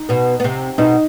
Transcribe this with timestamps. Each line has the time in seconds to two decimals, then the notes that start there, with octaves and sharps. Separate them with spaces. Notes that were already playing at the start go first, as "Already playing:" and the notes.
Already playing: D#4
0.09 B2 B3
0.40 B3
0.44 C3 C4
0.78 B2 B3 D#4